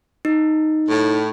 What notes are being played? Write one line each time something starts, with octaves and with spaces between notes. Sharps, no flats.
D#4
A2